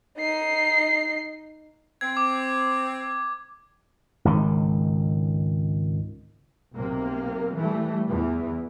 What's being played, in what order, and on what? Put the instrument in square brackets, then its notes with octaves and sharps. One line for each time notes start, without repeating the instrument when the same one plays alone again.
[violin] D#4 C7
[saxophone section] C4 [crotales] G#6
[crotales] D6
[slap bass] G#1 C#2 D#3
[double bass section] B1 C3 A#3
E3 G3 A3
E2 E3